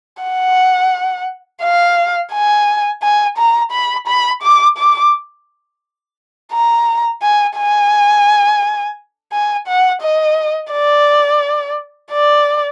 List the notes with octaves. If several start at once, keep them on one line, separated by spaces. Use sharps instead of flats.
F#5
F5
G#5
G#5
A#5
B5
B5
D6
D6
A#5
G#5
G#5
G#5
F#5
D#5
D5
D5